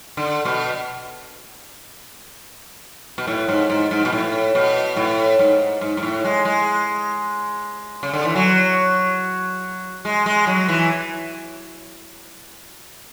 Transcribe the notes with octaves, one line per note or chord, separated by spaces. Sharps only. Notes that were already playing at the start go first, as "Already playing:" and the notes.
D3
B2
B2
A2
G#2
G#2
G#2
B2
A2
B2
A2
G#2
G#2
G#2
A2
G#3
G#3
C#3
D3
E3
F#3
G#3
G#3
F#3
E3